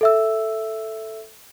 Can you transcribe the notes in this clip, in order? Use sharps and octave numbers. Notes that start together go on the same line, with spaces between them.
A4 E5 E6